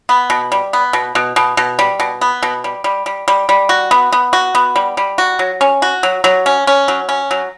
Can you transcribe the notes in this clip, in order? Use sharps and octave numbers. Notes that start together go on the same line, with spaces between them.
B3
B2
G3
B3
B2
B2
B2
B2
G3
B2
B3
B2
G3
G3
G3
G3
G3
F#4
B3
B3
F#4
B3
G3
G3
F#4
F#3
C#4
F#4
F#3
F#3
C#4
C#4
F#3
C#4
F#3